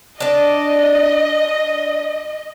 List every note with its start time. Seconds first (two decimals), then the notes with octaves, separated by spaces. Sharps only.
0.20 D4 D5 D#5